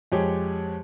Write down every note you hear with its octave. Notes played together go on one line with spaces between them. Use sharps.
F2 G#3 G4 C#5 D6